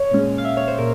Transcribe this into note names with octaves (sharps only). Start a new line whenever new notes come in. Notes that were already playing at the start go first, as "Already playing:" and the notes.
Already playing: C#5
A#2 G#3 C#4
F5
E5
C#5
C5
A#2 A#4